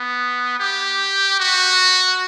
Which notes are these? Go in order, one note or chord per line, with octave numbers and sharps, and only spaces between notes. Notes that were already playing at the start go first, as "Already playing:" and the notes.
Already playing: B3
G4
F#4